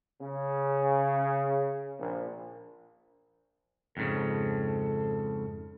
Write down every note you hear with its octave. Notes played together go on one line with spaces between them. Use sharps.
C#3
A#1
F2 G#2 C#3 A4